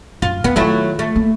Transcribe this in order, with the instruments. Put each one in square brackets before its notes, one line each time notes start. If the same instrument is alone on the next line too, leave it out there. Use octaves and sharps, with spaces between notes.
[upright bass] F#2 [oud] F4
[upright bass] E2 [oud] B3
[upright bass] D#3 F4 [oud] F#3 A3 E4
[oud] A3
[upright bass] A#3